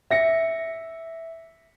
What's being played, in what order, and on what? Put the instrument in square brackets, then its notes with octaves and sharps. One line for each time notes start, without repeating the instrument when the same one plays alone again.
[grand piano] E5 A#6 C#7